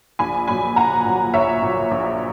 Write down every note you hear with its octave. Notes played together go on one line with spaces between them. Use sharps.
A#1 G#5 B5
A#2 F#3 G#5 B5
A#1 F#5 A#5
A#2 F#3
A#1 C#5 E5
A#2 F#3
A#1